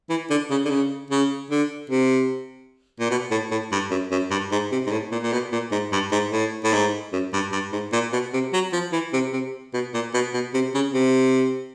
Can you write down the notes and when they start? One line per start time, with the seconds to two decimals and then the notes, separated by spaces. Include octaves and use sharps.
0.10 E3
0.30 D3
0.51 C#3
0.65 D3
0.70 C#3
1.10 C#3
1.50 D3
1.90 C3
3.00 A#2
3.11 B2
3.31 A2
3.51 A2
3.72 G2
3.91 F#2
4.11 F#2
4.31 G2
4.52 G#2
4.72 C3
4.87 G#2
4.91 A2
5.12 A#2
5.23 A#2
5.32 B2
5.52 A#2
5.72 G#2
5.92 G2
6.12 G#2
6.32 A2
6.64 A2
6.73 G#2
7.13 F#2
7.33 G2
7.52 G2
7.72 G#2
7.93 A#2
8.13 B2
8.33 C3
8.53 F#3
8.73 F3
8.93 E3
9.13 C3
9.33 C3
9.74 B2
9.94 A#2
10.14 B2
10.34 B2
10.54 C3
10.75 C#3
10.93 C3